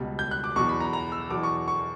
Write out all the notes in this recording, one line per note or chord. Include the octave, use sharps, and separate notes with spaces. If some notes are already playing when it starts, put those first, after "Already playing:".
Already playing: C#2 B2 G3
G6
F#6
D6
E2 B2 F#3 C#6
B5
A#5
A#5
E6
E2 B2 F#3 D6
C#6
C#6